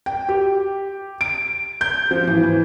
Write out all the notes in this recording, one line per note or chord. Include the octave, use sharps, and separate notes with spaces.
G5
G4
D7
G6
F3
E3
E3